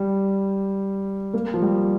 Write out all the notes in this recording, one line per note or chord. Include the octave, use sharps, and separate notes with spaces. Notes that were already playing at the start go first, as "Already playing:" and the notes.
Already playing: G3
A#3
F3
G3